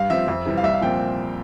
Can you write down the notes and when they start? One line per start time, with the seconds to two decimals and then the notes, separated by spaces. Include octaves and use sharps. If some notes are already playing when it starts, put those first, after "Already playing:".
Already playing: G2 F5
0.10 F3 C4 E5
0.28 F2
0.45 C3 E3 G3
0.57 F5
0.63 C2 E5
0.73 F5
0.81 A#2 F3 C4 G5